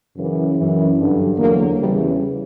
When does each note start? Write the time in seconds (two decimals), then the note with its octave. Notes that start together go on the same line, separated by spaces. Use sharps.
0.14 F#2 C#3 E3
0.55 E3
0.60 F#2
0.96 G2 D3 F#3
1.37 E2 D3 F#3 A#3
1.77 E2 C#3 E3 G3